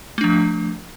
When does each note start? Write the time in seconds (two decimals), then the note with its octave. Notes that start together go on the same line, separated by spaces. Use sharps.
0.18 A3
0.21 D4
0.24 F3